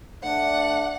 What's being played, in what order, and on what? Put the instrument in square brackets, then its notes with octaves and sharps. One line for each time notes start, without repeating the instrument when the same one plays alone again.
[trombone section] A3 D4 [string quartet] F#5